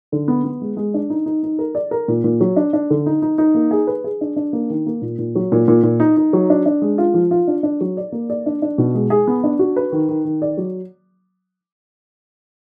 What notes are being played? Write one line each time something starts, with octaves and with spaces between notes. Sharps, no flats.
D3
B3
B3
G#3
G#3
D4
D#4
D#4
D#4
A#4
D5
A#4
A#2
A#2
F#3
D4
D4
D3
D#4
D#4
D#4
A#3
G#4
B4
G#4
D4
D4
A#3
D#3
A#3
A#2
A#2
F#3
A#2
A#2
A#2
D#4
D#4
F#3
D4
D4
G#3
F4
F3
F4
D4
D4
F#3
D5
A#3
D5
D4
D4
B2
G#3
G#4
B3
D4
F#4
B4
D#3
D#3
D#3
D5
F#3